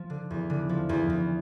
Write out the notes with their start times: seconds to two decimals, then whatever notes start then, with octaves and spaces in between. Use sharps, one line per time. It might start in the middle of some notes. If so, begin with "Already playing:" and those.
Already playing: F3
0.10 D3
0.30 E2
0.50 D3
0.69 F3
0.89 E2
1.10 E2